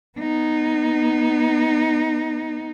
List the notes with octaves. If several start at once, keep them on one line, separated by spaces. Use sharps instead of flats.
B3 D#4